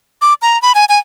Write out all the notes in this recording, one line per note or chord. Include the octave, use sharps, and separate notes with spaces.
D6
A#5
B5
G#5
G#5